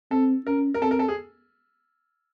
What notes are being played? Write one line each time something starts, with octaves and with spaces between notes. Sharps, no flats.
C4 A4
C#4 A#4
A#4
C4 A4
A#4
A4
G#4